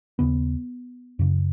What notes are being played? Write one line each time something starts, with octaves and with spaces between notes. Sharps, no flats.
D#2 C#3 B3
F#2 C#3